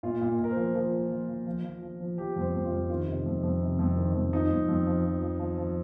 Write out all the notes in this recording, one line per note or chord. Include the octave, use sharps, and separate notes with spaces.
A#2 F4
A#2
A#2
A#4
C5
F3
F3 A#4
F3
F3
F3
F3
F3
F3
F3
F3 G4
F2
C5
F2
F4
F2
D#3 F4
C3
F2
F2
C3
F2
D#3
F2
F3 D#4
F2
F2
F3
F3
F3
F3
F3